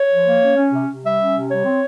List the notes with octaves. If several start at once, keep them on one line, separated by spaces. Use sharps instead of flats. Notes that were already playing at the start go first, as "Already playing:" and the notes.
Already playing: C#5
F3
A#3
C#4
C#4
C3
C3
G3 E5
C#4
C3
G3 C#5
C4